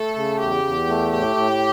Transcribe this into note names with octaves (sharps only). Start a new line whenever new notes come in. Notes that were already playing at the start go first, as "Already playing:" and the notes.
Already playing: A3 A4
C#3
E2 G4
E2
A3
A2 G4
A2